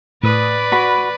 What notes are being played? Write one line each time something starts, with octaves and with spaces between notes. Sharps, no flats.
A2 B4 D5 D#6
F#4 B5